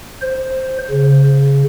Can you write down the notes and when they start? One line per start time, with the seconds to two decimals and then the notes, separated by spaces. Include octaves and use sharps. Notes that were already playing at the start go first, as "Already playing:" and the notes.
0.22 C5
0.90 C#3